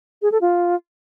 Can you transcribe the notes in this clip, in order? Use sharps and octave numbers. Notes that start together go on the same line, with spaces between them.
G#4
A4
F4